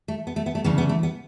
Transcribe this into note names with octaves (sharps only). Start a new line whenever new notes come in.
A3
B3
A3
B3
A3
D2 C#3 E3 B3
B3
A3
B3